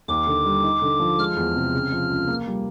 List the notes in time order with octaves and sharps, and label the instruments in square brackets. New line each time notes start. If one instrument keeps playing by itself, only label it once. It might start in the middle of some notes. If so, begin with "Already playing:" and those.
[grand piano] D#2 [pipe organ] D6
[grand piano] D3
G3
D#4
D3
F3
[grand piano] G#3 [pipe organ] F6
[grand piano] E2
C3
C#3
F3
C#2
A#3
G3